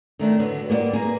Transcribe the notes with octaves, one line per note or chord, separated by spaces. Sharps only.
D#3 A3 D4 D#4
D3 F#3 B3
G3 A#3 B3 B4 D5
A#3 D#4 G#4 B4